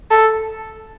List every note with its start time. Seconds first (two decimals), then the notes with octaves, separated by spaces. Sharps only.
0.11 A4